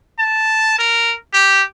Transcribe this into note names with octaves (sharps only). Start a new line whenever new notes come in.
A5
A#4
G4